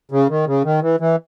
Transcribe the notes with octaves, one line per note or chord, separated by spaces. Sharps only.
C#3
D#3
C#3
D#3
E3
E3